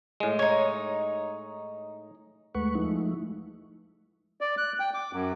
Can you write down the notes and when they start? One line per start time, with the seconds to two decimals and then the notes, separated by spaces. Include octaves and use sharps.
0.20 A2 G#3
0.39 D#4 C#5
2.55 D#2 G#3 A3 B4 F#5 C#6
2.75 F3 G#3 A3 D#4 E4
4.41 D5
4.58 F#6
4.80 G5
4.94 D6
5.13 F#2